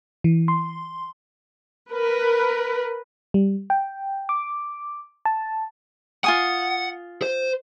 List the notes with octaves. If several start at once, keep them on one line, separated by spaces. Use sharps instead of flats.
E3
C6
A#4 B4
G3
G5
D6
A5
F4 F#5 G#5 D#6
C5